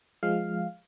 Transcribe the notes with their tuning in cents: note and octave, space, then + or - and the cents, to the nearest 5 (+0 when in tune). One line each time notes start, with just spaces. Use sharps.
F3 +0 G#3 +0 F5 +0